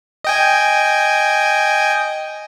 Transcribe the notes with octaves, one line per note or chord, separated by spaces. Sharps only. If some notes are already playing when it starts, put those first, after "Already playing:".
D#5 G5 G#5